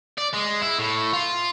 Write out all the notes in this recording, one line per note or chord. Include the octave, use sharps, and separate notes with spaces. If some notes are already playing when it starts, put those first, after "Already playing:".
D5
G#3
E4
A2
F4